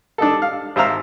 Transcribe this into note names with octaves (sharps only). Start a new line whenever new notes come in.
D4 D#4 A4
F5
G#1 C5 E5 F5 A#5 E6